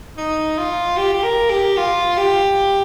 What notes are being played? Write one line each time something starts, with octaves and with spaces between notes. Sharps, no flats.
D#4
F4
G4
G4
A#4
G4
F4
G4